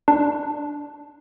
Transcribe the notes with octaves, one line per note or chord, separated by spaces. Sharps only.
D4